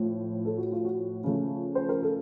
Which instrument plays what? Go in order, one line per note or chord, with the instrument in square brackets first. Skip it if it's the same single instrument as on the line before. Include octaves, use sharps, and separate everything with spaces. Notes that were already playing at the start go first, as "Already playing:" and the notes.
Already playing: [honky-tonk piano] A2 F3
A4
F#4
F4
F#4
C#3 F3 A3
C5
A#4
A4